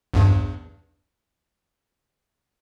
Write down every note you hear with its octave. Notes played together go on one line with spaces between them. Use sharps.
A#1 E2 G2